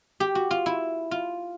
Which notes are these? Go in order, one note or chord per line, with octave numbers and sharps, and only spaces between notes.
G4
F#4
F4
E4
F4